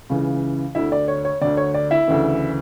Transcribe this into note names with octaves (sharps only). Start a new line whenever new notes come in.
C#2 C#3 E3
D2 D3 E4 E5
D5
C#5
C#5
D2 D3 D5
C#5
D5
E4 E5
D2 C#3 E3